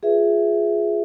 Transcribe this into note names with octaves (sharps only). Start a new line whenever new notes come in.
F4 G#4 B4 E5